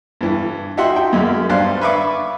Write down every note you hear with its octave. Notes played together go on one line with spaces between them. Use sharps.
G2 E3
D#4 F#4 E5 F#5 G5 C6
G5
F#2 G#3 A#3
G2 C5 D5 F5 F#6
B4 E5 F5 B5 C#6 D6